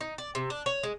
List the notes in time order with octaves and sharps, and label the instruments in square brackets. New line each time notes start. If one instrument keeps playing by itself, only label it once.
[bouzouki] D#4
D5
C3
D4
C#5
G#3